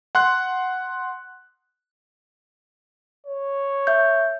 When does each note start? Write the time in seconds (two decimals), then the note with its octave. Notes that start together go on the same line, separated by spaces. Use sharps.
0.15 F#5 C6 F#6
3.27 C#5
3.87 E5 G6